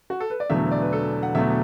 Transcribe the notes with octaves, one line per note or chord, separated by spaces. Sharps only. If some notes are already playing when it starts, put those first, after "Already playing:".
F#4
A4
B4
D5
E1 E2 D3 F#3 A3 E5
D5
B4
A4
F#5
E1 E2 D3 F#3 A3 E5